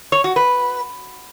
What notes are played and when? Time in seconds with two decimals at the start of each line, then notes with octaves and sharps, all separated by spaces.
0.12 C#5
0.24 F#4
0.36 B4